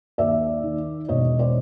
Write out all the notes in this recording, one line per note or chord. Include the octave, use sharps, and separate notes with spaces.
D#2 D5 E5
D#3
E1 C#5 D#5
C5 D5